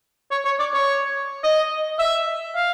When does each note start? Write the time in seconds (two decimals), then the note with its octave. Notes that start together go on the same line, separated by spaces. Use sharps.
0.31 C#5
0.45 C#5
0.59 D5
0.73 C#5
1.44 D#5
1.99 E5
2.55 F5